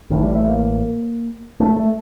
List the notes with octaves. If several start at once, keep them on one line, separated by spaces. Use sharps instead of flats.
A1 A2 D#3
G3
A3
A#3
A3
A3